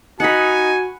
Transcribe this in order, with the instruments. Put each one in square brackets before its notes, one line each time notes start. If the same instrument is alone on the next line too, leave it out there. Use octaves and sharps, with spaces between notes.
[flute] D#4 [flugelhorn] F#4 [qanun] F#5 B5 [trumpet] G#5